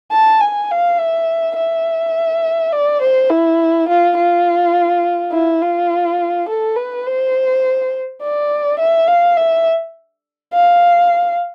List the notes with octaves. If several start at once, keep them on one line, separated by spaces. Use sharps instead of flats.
A5
G#5
F5
E5
E5
D5
C5
E4
F4
F4
E4
F4
A4
B4
C5
D5
E5
F5
E5
F5